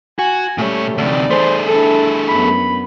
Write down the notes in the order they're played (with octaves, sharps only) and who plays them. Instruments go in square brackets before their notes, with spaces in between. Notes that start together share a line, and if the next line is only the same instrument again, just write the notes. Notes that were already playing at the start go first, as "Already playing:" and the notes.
[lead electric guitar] F#4 [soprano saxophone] G#5
[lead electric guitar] A#2 C#5 [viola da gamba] G3 C#4 G4 [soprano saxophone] A3
[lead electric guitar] D2 C3 [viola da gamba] E3 D#4 D5
[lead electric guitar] A3 G#4 [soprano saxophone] C5
[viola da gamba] D4 E4 [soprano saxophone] A4
[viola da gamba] F#2 B3 [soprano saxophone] B5